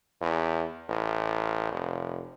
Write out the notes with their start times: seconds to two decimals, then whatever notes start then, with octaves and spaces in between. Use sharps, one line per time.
0.22 E2
0.89 A1
1.72 F1